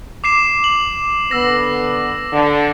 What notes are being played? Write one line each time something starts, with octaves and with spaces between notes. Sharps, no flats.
D6 C7 E7
F#7
D3 B3 E6 A#6
D3